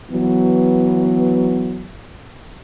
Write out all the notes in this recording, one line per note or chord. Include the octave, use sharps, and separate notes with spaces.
E3 F#3 B3